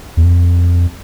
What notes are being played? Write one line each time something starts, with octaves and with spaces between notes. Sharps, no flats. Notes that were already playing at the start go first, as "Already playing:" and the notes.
E2
F2